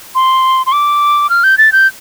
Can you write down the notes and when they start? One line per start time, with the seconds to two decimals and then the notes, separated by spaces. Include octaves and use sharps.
0.15 C6
0.66 C6
0.72 D6
1.30 F6
1.44 G6
1.58 A6
1.72 G6